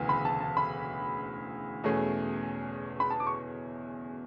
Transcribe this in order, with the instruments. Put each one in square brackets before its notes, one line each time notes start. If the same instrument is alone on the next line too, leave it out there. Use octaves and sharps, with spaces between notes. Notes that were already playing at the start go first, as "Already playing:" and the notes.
Already playing: [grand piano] E1 D2 C#3 E3 B3
[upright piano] B5
A5
A5
B5
[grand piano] E2 B2 A3 C#4 G#4
[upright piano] B5
A5
D6
C#6